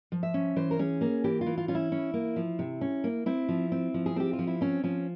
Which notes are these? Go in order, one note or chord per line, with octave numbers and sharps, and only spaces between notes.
F3
E5
C#4
E3 C5
A#4
C#4 G#4
A#3 G#4
E3 G4
F4
E3
F4
C#4 F4
E4
C#4
A#3
F3
C3
C#4
A#3
C4 E4
F3
C4
F3
G#4
C4 G4
F4
F3
E4
C4 C#4
F3 C#4